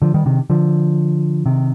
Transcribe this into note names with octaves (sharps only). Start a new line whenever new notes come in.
D3 F3
D#3 G3
C3 D#3
D3 F3
C3 D#3